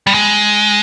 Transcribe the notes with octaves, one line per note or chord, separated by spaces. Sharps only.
G3
G#3